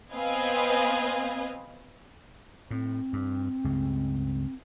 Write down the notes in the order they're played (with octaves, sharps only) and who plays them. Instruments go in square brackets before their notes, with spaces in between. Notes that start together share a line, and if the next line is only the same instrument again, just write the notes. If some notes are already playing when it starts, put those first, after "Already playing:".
[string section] B3 C4 B4 D#5 F5 G#5
[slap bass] A2 [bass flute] C4
[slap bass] G2
C#2 G2 C#3